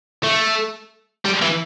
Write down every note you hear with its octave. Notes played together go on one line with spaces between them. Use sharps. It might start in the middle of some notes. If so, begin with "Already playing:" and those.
A3
G3
E3